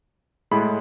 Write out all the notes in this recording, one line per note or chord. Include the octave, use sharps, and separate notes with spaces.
A2 G#3 B5